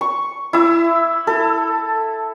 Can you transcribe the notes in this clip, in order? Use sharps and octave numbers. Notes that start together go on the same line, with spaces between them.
C#6
E4 E6
A4